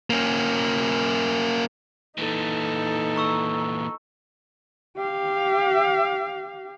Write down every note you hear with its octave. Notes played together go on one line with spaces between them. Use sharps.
A#3 C#4
A#2 E3 D#4 A4
A#5 C#6 E6
G4 F5